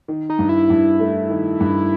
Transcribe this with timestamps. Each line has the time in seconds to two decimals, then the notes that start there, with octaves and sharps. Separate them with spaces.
0.08 D#3
0.29 D#4
0.39 G2
0.49 E4
0.70 G2
1.00 A3
1.30 D#3
1.60 G2